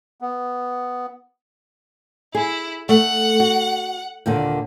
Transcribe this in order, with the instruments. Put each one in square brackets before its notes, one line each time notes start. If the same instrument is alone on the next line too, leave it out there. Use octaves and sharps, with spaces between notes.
[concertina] B3
[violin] E4 [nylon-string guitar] G#4
[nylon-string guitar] A3 [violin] F#5
[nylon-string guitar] F#4
D#2 A#2 D3